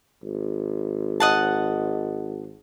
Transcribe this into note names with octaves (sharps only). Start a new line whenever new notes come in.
G#1
D#5 F#5 A5